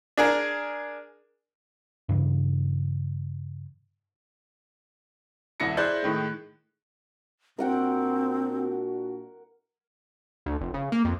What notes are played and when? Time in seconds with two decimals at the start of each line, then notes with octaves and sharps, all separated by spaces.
0.17 D4 G#4 A#4
2.09 G2 C#3 E3
5.60 D#1 C2 E4 A#6 C#7
5.77 E4 G#4 C5 D5 F#6 G6
6.03 A2 D#3 G#3
7.59 A#2 C4 D4 F#4 A#4 F#5 G5
10.46 D2
10.61 F1
10.74 C#3
10.92 A#3
11.05 F2